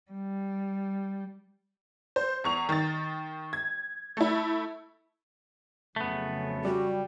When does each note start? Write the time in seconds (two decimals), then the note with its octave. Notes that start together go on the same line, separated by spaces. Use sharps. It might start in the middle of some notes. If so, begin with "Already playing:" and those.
0.12 G3
2.16 C5
2.44 E2 C#6 F7
2.69 D#3 A6
3.53 G#6
4.17 A3 E4
5.96 F2 C#3 F#3 A3 B3
6.65 G3 F#4